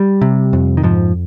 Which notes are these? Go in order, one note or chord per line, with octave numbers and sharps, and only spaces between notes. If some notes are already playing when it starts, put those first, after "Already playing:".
Already playing: G3
C3
F2
D#3
G#2 F3